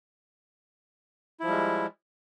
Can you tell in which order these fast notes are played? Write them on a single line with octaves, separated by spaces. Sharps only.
E4 F3 G3 G#3